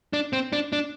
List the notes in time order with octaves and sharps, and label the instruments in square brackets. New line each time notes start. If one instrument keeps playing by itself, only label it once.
[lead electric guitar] D4
C4
D4
D4